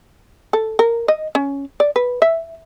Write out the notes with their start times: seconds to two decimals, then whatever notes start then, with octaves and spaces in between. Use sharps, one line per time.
0.53 A4
0.79 A#4
1.08 D#5
1.35 C#4
1.80 D5
1.96 B4
2.22 E5